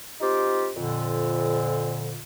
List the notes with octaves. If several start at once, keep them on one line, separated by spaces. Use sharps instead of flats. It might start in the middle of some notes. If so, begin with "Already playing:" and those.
C4 D#4 F4 G4
F2 A#2 D3